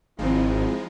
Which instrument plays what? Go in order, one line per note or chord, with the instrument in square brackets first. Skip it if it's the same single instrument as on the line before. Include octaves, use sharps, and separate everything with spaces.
[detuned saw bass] G#1 [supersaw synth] F3 G#3 [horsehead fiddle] C4 E4 [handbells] D#4 F5 B5